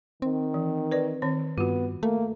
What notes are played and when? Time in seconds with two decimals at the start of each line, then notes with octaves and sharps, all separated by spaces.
0.22 D#3 C4
0.54 E3
0.91 B4 D5
1.22 D#3 C4 C#5
1.58 G2 B3 F4 F#4
2.03 A3 A#3